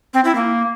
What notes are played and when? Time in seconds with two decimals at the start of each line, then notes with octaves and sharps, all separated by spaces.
0.14 C4
0.24 E4
0.35 A#3